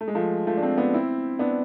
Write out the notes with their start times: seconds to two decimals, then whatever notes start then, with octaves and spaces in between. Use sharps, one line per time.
0.01 A3
0.08 G#3
0.15 F3 A3
0.47 F3 A3
0.57 D4
0.62 A3 C4
0.78 B3 D4
0.94 C4 E4
1.39 B3 D4